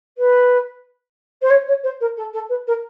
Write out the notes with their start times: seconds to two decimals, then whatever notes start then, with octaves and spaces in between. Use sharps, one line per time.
0.17 B4
1.41 C5
1.50 C#5
1.67 C#5
1.83 C5
2.00 A#4
2.16 A4
2.33 A4
2.49 B4
2.67 A#4